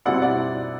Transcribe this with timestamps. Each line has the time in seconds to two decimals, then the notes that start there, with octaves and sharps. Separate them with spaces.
0.05 B2 G3 C4 E4 D5 F#5
0.22 D5 F#5